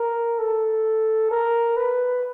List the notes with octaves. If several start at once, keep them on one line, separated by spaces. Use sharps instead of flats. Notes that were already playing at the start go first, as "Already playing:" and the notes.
Already playing: A#4
A4
A#4
B4